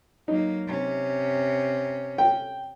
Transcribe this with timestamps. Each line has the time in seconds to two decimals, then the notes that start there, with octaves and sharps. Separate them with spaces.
0.28 F#3 A#3 D#4
0.67 C3 C#4
2.18 G5